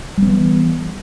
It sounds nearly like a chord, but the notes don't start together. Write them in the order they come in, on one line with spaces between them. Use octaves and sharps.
G3 B3 E3